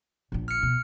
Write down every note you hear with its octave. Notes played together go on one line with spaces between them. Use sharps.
A#1 D3
F6 C#7
B2